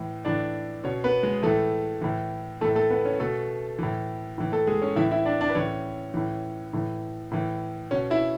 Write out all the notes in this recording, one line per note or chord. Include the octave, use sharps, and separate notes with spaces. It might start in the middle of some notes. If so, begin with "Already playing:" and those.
Already playing: A2 E3
A2 E3 D4 D5
B2 C#4 C#5
B3 B4
G#3 G#4
A2 E3 A3 A4
A2 E3
A2 E3 A3 A4
A3 A4
B3 B4
C#4 C#5
B2 A3 A4
A2 E3
A2 E3
A3 A4
G#3 G#4
C#4 C#5
A2 E3 E4 E5
E4 E5
D4 D5
D4 D5
B4
A2 E3 C#4 C#5
A2 E3
A2 E3
A2 E3
B2 C#4 C#5
E4 E5